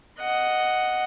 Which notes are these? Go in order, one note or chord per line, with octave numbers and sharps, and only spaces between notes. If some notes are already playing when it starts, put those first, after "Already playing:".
D#5 F#5